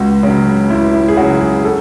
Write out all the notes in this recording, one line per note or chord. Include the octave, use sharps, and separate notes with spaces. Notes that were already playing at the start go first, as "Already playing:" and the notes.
Already playing: C#2 F#4
C#3 F#3
C#2 E4
E4
G#4
C#3 F#3 F#4
G#4
A4